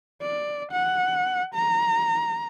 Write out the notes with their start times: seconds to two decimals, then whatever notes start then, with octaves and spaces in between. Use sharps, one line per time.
0.22 D5
0.72 F#5
1.55 A#5